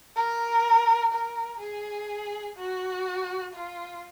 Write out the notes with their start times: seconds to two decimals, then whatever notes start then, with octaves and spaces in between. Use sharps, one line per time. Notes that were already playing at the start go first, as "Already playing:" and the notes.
0.16 A#4
1.13 A#4
1.60 G#4
2.57 F#4
3.54 F4